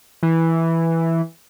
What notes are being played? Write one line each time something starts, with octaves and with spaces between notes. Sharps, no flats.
E3